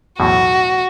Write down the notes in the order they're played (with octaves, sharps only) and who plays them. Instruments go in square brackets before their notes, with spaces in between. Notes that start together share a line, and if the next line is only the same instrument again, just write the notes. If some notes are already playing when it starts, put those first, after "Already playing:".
[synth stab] B1 E2 A2 [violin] F#4